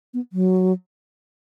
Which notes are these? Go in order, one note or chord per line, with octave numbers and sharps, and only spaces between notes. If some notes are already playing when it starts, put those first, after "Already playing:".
B3
F#3